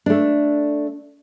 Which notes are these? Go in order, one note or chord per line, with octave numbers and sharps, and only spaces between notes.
A3 D4